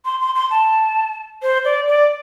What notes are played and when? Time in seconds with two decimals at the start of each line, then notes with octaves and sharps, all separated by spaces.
0.05 C6
0.21 C6
0.35 C6
0.51 A5
1.42 C5
1.65 D5
1.88 D5